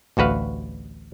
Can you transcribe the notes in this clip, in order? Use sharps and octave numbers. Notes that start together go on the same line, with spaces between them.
A1 D2 F#4 B4 F5